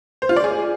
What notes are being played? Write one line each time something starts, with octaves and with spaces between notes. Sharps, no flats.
C5
F4
D5
G#4